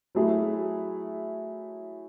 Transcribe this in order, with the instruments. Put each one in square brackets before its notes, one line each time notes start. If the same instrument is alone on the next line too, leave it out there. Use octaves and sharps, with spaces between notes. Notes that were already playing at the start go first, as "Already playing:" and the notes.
[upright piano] F#3 A3 E4 G#4